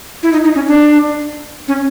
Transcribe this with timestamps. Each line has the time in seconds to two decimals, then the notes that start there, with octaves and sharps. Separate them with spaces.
0.23 E4
0.32 D#4
0.45 D#4
0.55 C#4
0.67 D4
1.68 C#4